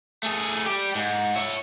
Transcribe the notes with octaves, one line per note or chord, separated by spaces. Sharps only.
A3 G#4
G3 G4
G#2
C#5 E5